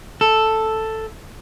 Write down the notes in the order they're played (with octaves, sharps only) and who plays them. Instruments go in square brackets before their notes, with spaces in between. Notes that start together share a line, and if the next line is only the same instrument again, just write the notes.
[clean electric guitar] A4